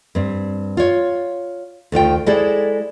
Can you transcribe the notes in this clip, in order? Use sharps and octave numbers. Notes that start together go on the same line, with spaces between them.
G2 C4
F4 C#5
D2 D#3 F4 G5
G#3 E4 G#4 A4 C5 D5